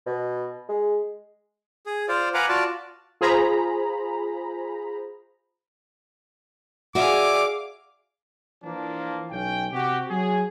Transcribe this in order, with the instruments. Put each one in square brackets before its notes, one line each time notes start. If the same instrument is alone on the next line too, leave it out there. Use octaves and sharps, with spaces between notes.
[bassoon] B2
G#3
[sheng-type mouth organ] G#4
F4 C5 D5 F5
B4 F5 F#5 G#5 A#5 D6
F4 F#4 D5 A5
[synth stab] F4 G#4 C5 A#5 B5
[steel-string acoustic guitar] F#4 D5 E5 [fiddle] G#4 F5 [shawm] D6
[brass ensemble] E3 F3 A#3 D4
B1 C#4 G5
C3 F#4 G4
F#3 F#4 G#4